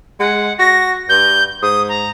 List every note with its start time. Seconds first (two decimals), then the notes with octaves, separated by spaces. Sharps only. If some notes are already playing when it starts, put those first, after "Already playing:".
0.20 G#3 F#5
0.59 F#4 A#6
1.09 G2 G6
1.62 G#2 D#6
1.88 A#5